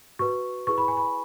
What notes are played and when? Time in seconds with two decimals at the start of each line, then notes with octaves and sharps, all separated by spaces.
0.19 F#4 B4 C#6
0.67 E4 G#4 B4 C#6
0.78 B5
0.88 G#5
0.97 B5